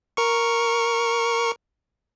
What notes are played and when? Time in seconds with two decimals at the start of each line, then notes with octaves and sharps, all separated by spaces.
0.17 A#4 C#6